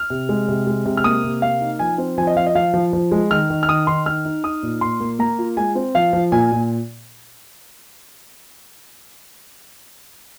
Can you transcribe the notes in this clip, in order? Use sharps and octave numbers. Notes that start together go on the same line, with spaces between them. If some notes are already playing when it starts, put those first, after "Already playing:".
Already playing: F6
C3
G#3
C3
G#3
C3
F6
A#3 D#6
C3
A#3 F5
D#4
F3 G#5
C4
F3 G#5
D#5
F3 F5
D#5
F3 F5
F3
F3
G#3
D#3 F6
D#3
F6
D#3 D#6
D#3 C6
D#4 F6
D#4
D#4 D#6
A#2
A#2 C6
A#3
A#3 A#5
F4
G#3 G#5
C4
F3 F5
F3
A#2 G#5
A#2